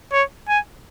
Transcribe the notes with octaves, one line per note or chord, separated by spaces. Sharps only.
C#5
G#5